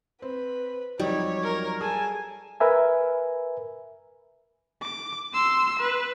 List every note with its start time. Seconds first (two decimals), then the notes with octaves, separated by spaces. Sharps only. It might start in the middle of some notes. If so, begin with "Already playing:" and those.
0.22 C4 B4
0.99 F2 F#3 G3 D#4 C#5
1.43 A#4
1.81 G#4 A4 G#5 A5
2.60 A#4 B4 E5 G#5
4.82 D6
5.34 C6 E6
5.80 B4